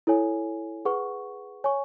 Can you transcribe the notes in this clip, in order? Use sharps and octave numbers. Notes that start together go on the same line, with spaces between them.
E4 A4 C#5 G#5
G#4 B4 F#5 C#6
C#5 G#5 C#6